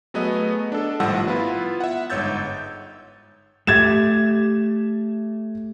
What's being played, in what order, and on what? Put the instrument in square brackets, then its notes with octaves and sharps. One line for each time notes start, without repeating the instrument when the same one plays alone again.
[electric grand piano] F#3 A3 B3 G#4 B4 D#5
D4 A4
G#1 A2 F3 G3 F#5 E6
B3 E4 F4 B4
E5 F#5
G1 G#2 C#5 E6 G6 A6
[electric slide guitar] A3 G4 E5 [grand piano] G#6 A6 E7